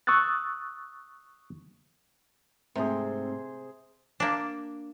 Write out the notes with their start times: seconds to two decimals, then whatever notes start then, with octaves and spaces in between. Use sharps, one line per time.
0.07 C#6 D#6 E6 F#6 A6
2.76 G#2 C3 A3 C4 G#4 C5
4.20 A#3 D4